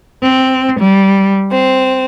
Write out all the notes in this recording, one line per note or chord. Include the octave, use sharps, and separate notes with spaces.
C4
G3
C4